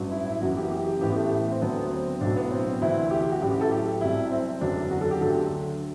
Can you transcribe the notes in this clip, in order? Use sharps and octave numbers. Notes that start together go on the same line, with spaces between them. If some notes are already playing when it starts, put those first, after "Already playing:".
Already playing: A1 G2 F#3
E4
E4
F#1 F#2 E3 F#4
G4
G4
G4
A1 A2 E3 G4
B3
A3
C4
D2 D3 F#3 B3
C4
B1 A2 F#3 D4
B3
C4
D2 C3 E3 E4
G4
G4
F#4
A1 A2 F#3 G4
G4
A4
G4
C2 C3 F#3 E4
C4
F#1 E2 D3 F#3 D4
F#4
A4
G4
D2 D3 F#3 A4